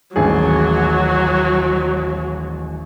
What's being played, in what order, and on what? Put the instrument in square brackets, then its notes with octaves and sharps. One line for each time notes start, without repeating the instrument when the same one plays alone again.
[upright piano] D#1 A1 G#4 [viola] F#3